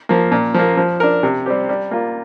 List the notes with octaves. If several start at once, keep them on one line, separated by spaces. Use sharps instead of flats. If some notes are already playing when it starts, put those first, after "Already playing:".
F3 A#3
A#2
F3 A#3
F3
D4 A#4
C3
G3 C4 G4
G3
A#3 F4